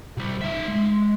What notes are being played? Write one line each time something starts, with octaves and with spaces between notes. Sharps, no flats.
C2 G3
D#4 E5
G#3